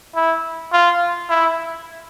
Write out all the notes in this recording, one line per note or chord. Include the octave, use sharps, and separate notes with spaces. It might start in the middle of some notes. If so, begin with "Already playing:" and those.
E4
F4
E4